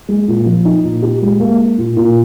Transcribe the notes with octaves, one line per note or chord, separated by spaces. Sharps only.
G#3
A#2
F3
D#4
A#2
G4
G#3
A#3
A#3
A#2
A#2